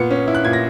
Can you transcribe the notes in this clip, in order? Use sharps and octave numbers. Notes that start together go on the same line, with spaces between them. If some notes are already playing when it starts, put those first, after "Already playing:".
Already playing: A#2 B3 C#7
C#4
E4
F#6
A#2 G#6
A#6